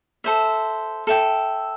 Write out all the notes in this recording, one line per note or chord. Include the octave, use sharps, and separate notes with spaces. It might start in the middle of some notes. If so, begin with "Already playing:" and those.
A4 C5 E5
A4 E5 G5